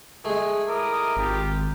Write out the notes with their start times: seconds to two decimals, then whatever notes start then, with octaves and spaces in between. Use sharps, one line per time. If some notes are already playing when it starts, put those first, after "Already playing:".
0.25 G#3 A3 G#4
0.68 E4 A#4 D6 D#6
1.17 G#1 F4 G4